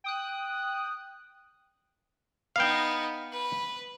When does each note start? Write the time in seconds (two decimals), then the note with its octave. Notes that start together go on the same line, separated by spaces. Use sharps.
0.04 G5 D#6 F#6
2.56 B3 D#4 F5 G5
3.32 B4